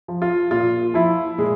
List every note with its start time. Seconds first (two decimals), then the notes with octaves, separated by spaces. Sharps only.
0.08 F3
0.22 F4
0.51 A#2 F4
0.94 F3 E4
1.38 A#2 G#3